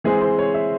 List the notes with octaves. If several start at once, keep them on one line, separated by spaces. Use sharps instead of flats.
E3 G#3 C4 G#4
C5
C#5
E5